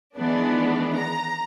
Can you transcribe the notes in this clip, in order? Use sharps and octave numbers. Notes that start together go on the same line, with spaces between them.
D#3 E3 G#3 B3 D4
A#5